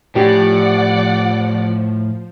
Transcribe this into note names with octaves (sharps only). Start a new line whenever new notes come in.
A2 F3 C#4 G4 D5 F#5